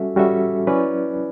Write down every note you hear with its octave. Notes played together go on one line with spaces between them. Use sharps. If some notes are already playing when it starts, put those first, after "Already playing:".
Already playing: G3 C#4 F#4 A4 E5
G3 C#4 F#4 A4 E5
F#3 C#4 E4 B4 D5